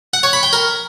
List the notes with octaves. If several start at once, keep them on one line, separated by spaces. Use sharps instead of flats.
F#5
C#5
B5
G5
A#4